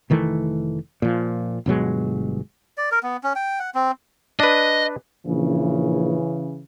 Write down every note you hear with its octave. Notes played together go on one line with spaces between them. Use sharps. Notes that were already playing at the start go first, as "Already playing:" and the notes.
F1 D#3 E3 A3
A#2 F3
G1 B2 F#3 G#3
D5
A#4
B3
C#4
G5
F#5
C4
D4 B4 D#5
A#1 C#3 E3